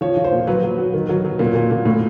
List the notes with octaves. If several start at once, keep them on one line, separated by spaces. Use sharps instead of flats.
F3 C#5
F3
C5
A#2
F#3 B4
F#3
F#3
D#3
F#3
F#3
A#2
A#2
A#2
A2